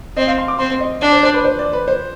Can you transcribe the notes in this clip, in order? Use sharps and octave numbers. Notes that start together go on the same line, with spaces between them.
C4 D#5
F5
C6
D6
C4 C6
D#5
D4 D5
C5
C5
B4
C5
D5
B4
C5